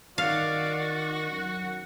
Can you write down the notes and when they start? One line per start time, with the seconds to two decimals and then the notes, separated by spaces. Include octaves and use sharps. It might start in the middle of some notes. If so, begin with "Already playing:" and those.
0.18 D#3 F#4 D5 F5
1.31 F#2 F#5